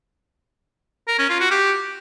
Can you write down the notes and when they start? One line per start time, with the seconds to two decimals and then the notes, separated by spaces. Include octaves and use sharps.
1.08 A#4
1.19 C#4
1.29 F4
1.40 F#4
1.51 G4